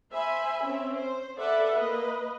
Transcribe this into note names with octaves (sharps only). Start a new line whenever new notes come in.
C5 E5 G#5 B5
C4 C#4 E5
C5
A4 B4 D5 E5 F#5
A#3 B4 D#5